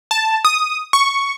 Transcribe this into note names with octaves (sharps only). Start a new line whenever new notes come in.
A5
D#6
C#6